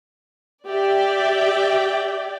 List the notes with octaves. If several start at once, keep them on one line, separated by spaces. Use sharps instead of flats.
G4 D5 E5 G5